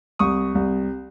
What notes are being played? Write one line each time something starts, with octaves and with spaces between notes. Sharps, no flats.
C2 C#6 D#6
C2